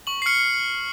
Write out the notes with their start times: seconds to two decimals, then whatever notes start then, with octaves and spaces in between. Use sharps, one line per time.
0.07 C#6 F#7
0.22 C7
0.26 F6 C#7